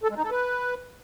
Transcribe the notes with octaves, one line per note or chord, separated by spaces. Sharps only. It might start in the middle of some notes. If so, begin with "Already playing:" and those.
A4
G#3
D#4
A4
B4